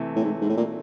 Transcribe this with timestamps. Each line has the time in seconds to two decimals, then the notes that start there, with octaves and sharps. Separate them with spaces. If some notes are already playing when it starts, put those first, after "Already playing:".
Already playing: C3 E3 A3
0.16 A2
0.24 G#2
0.41 G#2
0.49 A2
0.57 A#2